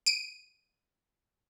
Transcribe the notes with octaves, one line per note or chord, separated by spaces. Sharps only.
D7 D#7